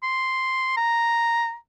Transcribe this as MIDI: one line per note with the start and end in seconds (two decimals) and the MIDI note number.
0.03 0.77 84
0.77 1.55 82